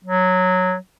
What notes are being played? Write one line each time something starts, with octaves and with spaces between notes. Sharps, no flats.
F#3